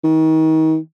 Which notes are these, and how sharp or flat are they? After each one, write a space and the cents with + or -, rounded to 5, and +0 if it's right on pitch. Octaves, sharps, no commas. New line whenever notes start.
D#3 +35